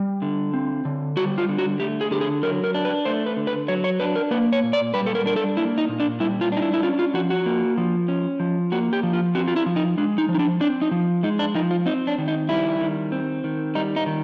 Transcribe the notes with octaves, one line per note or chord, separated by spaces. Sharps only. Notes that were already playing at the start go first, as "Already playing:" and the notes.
Already playing: G3
D3
C4
D3
G3 F#4
F4
D3
F#4
A3 G4
G#4
D3 G4
G#4
F#3 A#4
A#4
D4
B4
A3 C5
B4
D3
B4
F#3 C#5
C#5
D4 B4
A#4
A#3 B4
C#5
A#2
D5
G3 B4
A4
A#4
D4 A#4
A4
A#3 E4
D#4
A#2
D4
G3 E4
F4
D4 D#4
E4
E4
C#4 F4
F4
F3 F#4
F#4
A#3
F3
C#4
F3
A#3 F#4
G4
F3
F4
C4 F#4
F4
E4
F3
D#4
G#3 D4
D#4
F3
D#4
D4
C4 D4
D#4
F3
G#3 D#4
D4
F3 D#4
F4
C4 D#4
D4
D#3
D#4
G3 E4
D#3
C4
D#3
G3 D#4
D#4
D#3